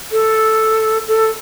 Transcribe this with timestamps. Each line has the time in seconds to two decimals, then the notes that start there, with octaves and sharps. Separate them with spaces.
0.12 A4
1.08 A4